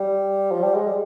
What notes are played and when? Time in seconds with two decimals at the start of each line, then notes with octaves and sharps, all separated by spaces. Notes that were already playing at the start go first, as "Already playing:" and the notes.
Already playing: G3
0.51 F3
0.63 G3
0.74 G#3
0.87 G3